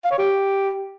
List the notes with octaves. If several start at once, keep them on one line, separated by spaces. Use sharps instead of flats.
F5
C#5
G4